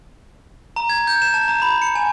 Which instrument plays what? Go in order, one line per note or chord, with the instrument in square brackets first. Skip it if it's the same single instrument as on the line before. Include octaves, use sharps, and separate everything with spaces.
[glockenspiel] A#5
G#6
G6
E7
A5
A#5
B5
C#7
G#5